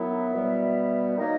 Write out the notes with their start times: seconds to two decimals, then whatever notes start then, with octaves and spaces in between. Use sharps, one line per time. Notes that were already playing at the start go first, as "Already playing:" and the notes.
Already playing: F#2 D#3 F#3 B3 E4 E5
0.34 B2 G3 B3
1.17 D#3 F#3 A#3 D#4 D#5